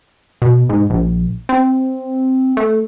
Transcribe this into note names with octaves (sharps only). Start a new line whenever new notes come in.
B2
G#2
A#1
C4
A3